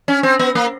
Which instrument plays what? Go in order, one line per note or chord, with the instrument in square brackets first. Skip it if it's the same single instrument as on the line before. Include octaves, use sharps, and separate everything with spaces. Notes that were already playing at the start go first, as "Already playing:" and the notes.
[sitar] C#4
C4
B3
A#3